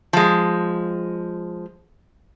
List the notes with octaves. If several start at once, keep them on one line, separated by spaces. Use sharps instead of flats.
F3 G#3